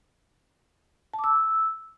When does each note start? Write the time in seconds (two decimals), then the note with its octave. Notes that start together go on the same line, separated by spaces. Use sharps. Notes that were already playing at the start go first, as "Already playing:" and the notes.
1.14 A5
1.19 D6
1.24 E6